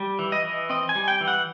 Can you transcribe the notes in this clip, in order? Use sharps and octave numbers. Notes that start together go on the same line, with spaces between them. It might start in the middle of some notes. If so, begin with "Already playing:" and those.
Already playing: G3
E3
D#5
E3
C4 D#5
G#5
G3
G5
E3
F#5